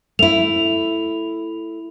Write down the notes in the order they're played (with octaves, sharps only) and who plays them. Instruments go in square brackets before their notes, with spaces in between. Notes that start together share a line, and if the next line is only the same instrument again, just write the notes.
[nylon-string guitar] A3 E4 [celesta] F7